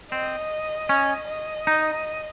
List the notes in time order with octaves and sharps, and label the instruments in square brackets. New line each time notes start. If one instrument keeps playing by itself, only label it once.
[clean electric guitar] C4 [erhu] D#5
[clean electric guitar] C#4
[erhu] D#5
[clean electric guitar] D#4